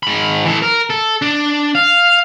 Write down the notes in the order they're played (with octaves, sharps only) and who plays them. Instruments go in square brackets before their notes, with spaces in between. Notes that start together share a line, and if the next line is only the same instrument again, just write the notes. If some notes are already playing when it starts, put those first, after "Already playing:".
[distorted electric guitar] G#2 B5
E3 A4
A#4
A4
D4
F5